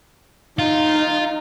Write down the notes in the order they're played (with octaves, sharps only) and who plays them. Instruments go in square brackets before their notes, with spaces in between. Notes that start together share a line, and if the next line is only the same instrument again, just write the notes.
[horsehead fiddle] D#4 [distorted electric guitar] F4